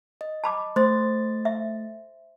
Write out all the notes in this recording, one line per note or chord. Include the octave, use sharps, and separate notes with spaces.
D#5
A5 B5 D6
A3 C5 C6 A6
E5